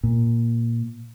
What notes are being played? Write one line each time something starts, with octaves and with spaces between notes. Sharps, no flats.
A#2